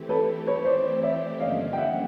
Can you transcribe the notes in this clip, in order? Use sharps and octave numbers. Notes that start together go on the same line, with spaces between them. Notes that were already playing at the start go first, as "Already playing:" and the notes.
Already playing: E3 A3 C4 E4 G4
A4 B4
B4 C#5
C5 D5
D5 E5
G2 D3 F3 A#3 C#4 D#5 F5
G5
E5 F#5